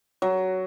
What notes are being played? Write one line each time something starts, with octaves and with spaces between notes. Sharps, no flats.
F#3